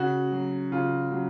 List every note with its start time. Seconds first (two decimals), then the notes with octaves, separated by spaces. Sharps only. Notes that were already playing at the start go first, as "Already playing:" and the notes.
Already playing: C#3 F#4
0.32 F#3
0.72 C#3 F4
1.11 F#3